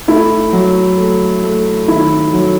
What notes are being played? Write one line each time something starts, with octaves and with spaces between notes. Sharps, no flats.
A3 E4
F#3
A3
A3
D#3 E4
F#3